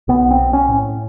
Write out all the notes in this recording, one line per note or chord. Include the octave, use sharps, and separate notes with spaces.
B1 B3
C4
B1
C#4
A2